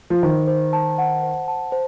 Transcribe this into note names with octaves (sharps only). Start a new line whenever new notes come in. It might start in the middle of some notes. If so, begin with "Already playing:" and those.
F3
D#3 C5
C5
A5
F#5
C5
A5
C5